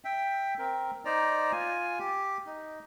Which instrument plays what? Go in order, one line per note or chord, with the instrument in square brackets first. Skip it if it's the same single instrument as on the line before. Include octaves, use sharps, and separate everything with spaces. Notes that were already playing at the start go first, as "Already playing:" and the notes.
[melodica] E5 G5
C4 A#4
D#4 C5 D5 A#5
F4 G#5
G4
D#4